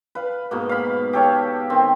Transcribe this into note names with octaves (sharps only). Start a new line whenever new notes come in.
B4 F5
G#2 B2 A#3
F5 B5
G4 A4 C#5 F5
D#3 C4